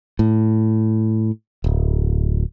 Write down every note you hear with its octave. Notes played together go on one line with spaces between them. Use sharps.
A2
D1